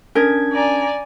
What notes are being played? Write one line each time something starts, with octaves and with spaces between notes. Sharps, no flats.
C#4 D4 A#4 G#6
D5 G#5 A#5